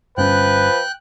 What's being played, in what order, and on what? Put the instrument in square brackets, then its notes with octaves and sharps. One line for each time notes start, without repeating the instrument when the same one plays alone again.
[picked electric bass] G1 G2 C#4 [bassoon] F3 [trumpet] B4 [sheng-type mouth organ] G5 F#6